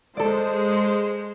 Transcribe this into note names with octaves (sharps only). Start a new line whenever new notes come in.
G#3 A4 C5 D5